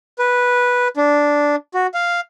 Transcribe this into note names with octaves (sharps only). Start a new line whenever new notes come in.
B4
D4
F#4
F5